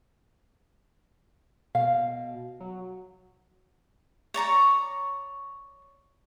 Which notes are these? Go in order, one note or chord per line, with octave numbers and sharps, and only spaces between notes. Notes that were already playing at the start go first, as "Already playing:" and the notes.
B2 F5
F#3
C#5 D5 A#5 C#6